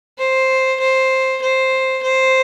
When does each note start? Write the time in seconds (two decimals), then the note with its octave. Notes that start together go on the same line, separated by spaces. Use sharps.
0.19 C5
0.80 C5
1.42 C5
2.03 C5